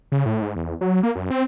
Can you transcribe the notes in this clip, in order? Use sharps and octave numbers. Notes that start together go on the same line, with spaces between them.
C#3
A2
G#2
E2
F#3
A#3
F#2
C4